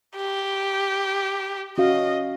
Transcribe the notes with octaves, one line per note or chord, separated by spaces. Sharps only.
G4
C#4 F#4 D#5 F5